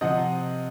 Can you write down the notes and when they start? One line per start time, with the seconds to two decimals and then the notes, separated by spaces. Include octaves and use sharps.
0.01 C3 F3 C4 D#5 F#5